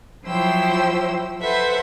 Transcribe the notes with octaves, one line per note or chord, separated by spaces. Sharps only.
F3 F#3 E4 C5 G5 E6
A4 B4 C5 E5 F#5